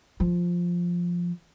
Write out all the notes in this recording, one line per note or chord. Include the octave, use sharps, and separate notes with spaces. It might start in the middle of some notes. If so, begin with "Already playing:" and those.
F3